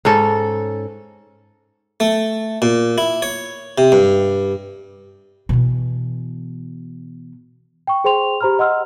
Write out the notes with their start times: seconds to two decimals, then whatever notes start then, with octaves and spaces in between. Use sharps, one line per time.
0.05 G#2 C#4 A4
2.00 A3
2.62 A#2
2.98 E4
3.22 C#5
3.78 C3
3.92 G2
5.49 B2 E3
7.87 G5 C#6
8.04 G#4 C5 G5 C6 F7
8.41 G4 C5 A#5 B5 F6
8.59 D#5 F#5 C6 E6 F6